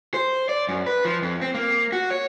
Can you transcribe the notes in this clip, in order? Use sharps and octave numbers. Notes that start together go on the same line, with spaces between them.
C5
D5
F#2
B4
F3
F2
C4
A#3
F#4
C#5